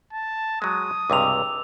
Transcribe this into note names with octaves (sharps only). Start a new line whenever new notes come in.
A5
F#3 G#3 D#6
C#2 G2 C3 D6 E6 F7